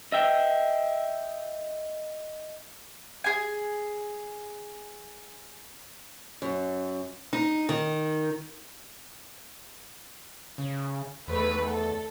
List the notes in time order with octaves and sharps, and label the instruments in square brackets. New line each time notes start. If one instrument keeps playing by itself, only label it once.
[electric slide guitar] D#5 E5 G5
[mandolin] G#4 G#5
[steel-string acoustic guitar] F#2
D#4
D#3
[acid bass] C#3
[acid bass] E2 [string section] D#3 A3 B4
[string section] A4